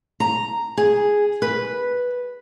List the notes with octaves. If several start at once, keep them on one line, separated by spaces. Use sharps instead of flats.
A#5
G#4
B4